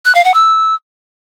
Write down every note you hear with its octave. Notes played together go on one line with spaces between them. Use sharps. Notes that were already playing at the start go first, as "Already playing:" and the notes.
F#6
F5
F#5
E6